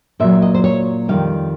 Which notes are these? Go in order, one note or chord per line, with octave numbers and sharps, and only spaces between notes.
A#2 F#3 E5
D#5
C5
C#5
F2 C3 D#3 G3 F5